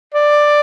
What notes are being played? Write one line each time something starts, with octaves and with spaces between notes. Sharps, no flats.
D5